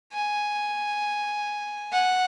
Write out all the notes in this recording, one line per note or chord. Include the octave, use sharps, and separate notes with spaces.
G#5
F#5